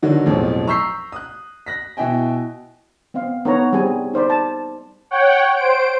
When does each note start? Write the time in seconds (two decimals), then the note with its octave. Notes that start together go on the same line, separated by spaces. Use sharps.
0.02 D3 D#3 F#3 D#4
0.25 B1 F2 A2 F3 F#3 G#3
0.67 A#5 C#6 E6 G6 B6 C7
1.12 D#6 F#6
1.66 F#6 A#6 B6
1.97 B2 E4 D#5 G5 G#5
3.14 B3 C4 D#5 F5
3.45 B3 D#4 A4 C#5 A#5
3.73 G3 C4 F#4 G#4 G#5
4.14 D#4 C5 D5 B5
4.30 A5
5.11 C#5 F#5 G5
5.56 C5 D7